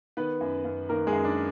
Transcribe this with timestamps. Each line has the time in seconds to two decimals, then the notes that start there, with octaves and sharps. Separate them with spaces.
0.17 D#3 B3 B4
0.41 F#2
0.65 F#2
0.89 D#3 A#3 A#4
1.07 G#3 G#4
1.12 F#2
1.24 D4